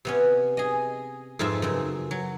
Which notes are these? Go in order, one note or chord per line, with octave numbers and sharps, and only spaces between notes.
C3 B3 C#4
G#4 D#5
F2 G#2 C4 F4 E5
F#2 C#3 C4
F#3